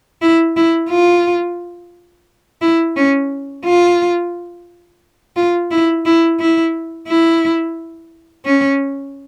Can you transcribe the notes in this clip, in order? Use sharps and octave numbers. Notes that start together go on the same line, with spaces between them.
E4
E4
F4
E4
C#4
F4
F4
E4
E4
E4
E4
C#4